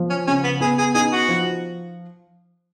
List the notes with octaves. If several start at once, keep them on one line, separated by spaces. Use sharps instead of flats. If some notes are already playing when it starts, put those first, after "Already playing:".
Already playing: F3
C#4
C#3 C#4
B3
B3 G#4
G#4
D#4 G#4
F#4
F3